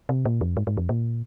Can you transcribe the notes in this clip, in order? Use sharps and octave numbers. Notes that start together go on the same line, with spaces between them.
C3
A#2
F2
G#2
G#2
F2
A#2